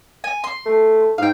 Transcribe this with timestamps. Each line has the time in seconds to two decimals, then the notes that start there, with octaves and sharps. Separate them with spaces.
0.24 G#5
0.44 C6
0.66 A3
1.18 G#2 F5 G5